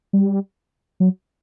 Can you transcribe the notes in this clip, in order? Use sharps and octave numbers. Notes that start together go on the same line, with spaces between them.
G3
F#3